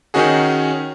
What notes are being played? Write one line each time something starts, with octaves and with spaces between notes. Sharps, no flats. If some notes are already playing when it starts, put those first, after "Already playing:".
D#3 C#4 D#4 F#4 G#4